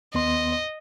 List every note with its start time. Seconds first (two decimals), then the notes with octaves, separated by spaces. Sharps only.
0.14 D#2 B3 D#5 C6